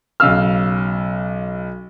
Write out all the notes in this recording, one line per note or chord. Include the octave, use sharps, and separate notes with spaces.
B1 C#3 F5 E6 F6